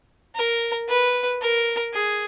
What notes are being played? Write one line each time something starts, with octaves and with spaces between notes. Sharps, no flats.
A#4
B4
A#4
G#4